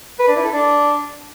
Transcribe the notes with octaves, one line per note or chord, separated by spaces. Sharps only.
B4
D4
E4
A4
D4